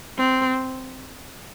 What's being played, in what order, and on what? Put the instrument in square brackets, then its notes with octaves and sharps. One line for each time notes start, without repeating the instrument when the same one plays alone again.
[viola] C4